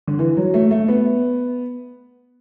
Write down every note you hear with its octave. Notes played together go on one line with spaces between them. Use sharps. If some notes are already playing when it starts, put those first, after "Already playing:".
D3
E3
F#3
A3
A3
B3